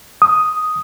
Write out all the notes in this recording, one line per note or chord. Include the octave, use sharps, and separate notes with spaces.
D#6